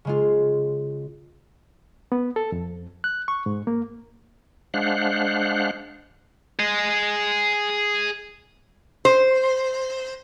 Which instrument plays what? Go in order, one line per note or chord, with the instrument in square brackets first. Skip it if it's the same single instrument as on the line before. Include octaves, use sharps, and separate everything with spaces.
[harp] C#3 G#3 F4
[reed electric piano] B3
A4
F2
F#6
C#6
G#2
A#3
[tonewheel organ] G#3 D4 C5 F5 F#5 F#6
[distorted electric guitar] G#4 D#5
[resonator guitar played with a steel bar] C5